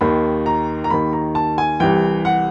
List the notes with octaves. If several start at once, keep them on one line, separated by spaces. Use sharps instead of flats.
D#2 D#3 B5
A#5
A#5
D#2 D#3 B5
A#5
A5
G#5
C2 C3 E3 G5
F#5